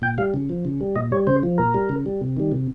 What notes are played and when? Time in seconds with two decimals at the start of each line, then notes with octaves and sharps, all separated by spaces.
0.02 A#2 G5
0.18 G3 F5
0.34 C#3
0.49 F3
0.65 C#3
0.81 G3
0.96 A#2 D#5
1.12 G3 C#5
1.27 C#3 C5
1.43 F3
1.58 A#2 A#4
1.74 G3
1.89 C#3
2.06 G3
2.21 C3
2.37 D#3 G3
2.52 C3